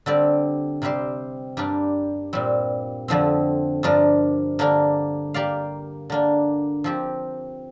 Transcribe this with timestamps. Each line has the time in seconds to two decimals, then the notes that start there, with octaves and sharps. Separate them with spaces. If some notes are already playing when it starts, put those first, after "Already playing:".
0.06 D3 G3 C4 G4 D5
0.82 C3 G3 C4 G4 C5
1.57 G2 G3 A#3 D4 G4
2.33 A#2 G3 C4
3.08 F2 D3 F3 C4
3.83 G2 F3 D4 A#4
4.59 D3 A#3 D4 A#4
5.34 A#3 G4 D5 F5
6.10 D3 A#3 D4
6.84 F3 C4 G4